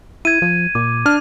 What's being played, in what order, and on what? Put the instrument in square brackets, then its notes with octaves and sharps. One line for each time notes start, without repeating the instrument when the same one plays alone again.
[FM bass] E4 [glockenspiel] G#6 D#7
[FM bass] F3
[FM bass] A#2 [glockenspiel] D6
[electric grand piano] D4 F6